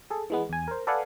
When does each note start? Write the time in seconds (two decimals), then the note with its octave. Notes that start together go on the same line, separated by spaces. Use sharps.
0.10 G#4 A4
0.30 E3 G#3 B3
0.50 E2 G#5
0.68 A#4 C5
0.87 A4 B4 D5 F5 F#5 G#5